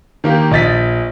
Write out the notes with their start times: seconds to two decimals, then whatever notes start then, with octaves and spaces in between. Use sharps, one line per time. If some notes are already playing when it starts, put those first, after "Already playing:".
0.24 D#3 A#3 G4
0.51 A#1 D#5 A6 B6